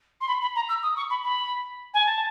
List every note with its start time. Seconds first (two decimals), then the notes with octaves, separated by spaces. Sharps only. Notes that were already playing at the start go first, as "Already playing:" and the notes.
0.21 C6
0.28 B5
0.42 B5
0.56 A#5
0.69 E6
0.83 D#6
0.96 C#6
1.10 B5
1.23 B5
1.94 G#5
2.06 A5